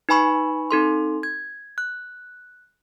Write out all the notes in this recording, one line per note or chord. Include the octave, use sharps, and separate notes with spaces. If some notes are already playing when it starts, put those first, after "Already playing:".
D#4 B4 G#5 B5 C#6
C4 D#4 A4 C6
G#6
F#6